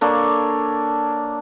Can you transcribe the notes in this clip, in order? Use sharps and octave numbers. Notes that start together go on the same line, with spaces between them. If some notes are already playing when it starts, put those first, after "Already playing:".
A#3 D4 A4 C#5